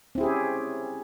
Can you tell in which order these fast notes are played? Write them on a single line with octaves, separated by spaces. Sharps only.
C4 E4 G#4 G4 C#4